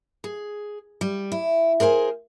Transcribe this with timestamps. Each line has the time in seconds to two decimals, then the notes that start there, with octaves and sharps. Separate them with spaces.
0.24 G#4
1.01 G3
1.32 E4
1.80 G#4 A#4 C5 F#5 G#5